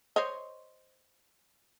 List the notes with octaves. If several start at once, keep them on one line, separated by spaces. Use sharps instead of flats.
C5 C#5 D#5